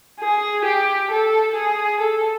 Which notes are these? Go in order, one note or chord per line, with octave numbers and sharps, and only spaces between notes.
G#4
G4
A4
G#4
A4